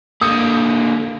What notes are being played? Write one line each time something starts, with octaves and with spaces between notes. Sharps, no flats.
D3 A#3 D#6 G6 C#7